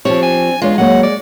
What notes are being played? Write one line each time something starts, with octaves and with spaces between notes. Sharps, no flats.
F3 C4 D4 G4 C#5
G#5
E2 G#3 D4 F4 C#5
F#3 A#3 C#5 F#5
D5